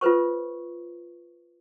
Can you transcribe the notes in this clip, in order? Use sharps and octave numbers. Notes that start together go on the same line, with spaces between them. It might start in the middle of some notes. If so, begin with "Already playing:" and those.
F4 A4 B4 C5 C#6